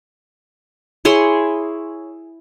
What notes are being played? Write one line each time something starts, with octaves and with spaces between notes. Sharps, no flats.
E4 G#4 C#5 C6